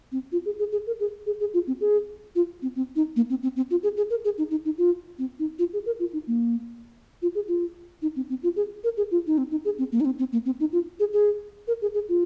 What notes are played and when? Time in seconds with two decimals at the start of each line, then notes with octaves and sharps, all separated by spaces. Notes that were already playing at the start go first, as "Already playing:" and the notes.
0.12 C4
0.32 F4
0.45 G#4
0.59 G#4
0.72 G#4
0.87 A#4
1.00 G#4
1.26 G#4
1.40 G#4
1.54 F4
1.67 C4
1.81 G#4
2.35 F4
2.62 C4
2.75 C4
2.96 D#4
3.16 A#3
3.30 C4
3.43 C4
3.56 C4
3.71 F4
3.83 G#4
3.97 G#4
4.10 A#4
4.24 G#4
4.38 D#4
4.51 D#4
4.65 D#4
4.78 F4
5.19 C4
5.39 D#4
5.59 F4
5.73 G#4
5.86 A#4
5.99 F4
6.13 D#4
6.27 A#3
7.22 F4
7.35 G#4
7.48 F4
8.02 D#4
8.16 C4
8.29 C4
8.43 F4
8.56 G#4
8.84 A#4
8.97 G#4
9.11 F4
9.27 D#4
9.38 C4
9.51 D#4
9.65 G#4
9.78 C4
9.92 A#3
10.00 D#4
10.05 C4
10.19 C4
10.32 A#3
10.45 C4
10.60 D#4
10.72 F4
11.00 G#4
11.13 G#4
11.68 A#4
11.82 G#4
11.94 G#4
12.09 F4